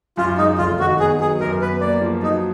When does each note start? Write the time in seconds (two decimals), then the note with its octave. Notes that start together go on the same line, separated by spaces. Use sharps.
0.17 F#2 F4
0.38 G#3 D#4
0.58 F1 F4
0.80 D#3 F#4
0.99 B3 G#4
1.20 F#3 G#4
1.40 F#2 A#4
1.61 B3 B4
1.81 A#3 D5
2.02 F3
2.23 F#3 D#4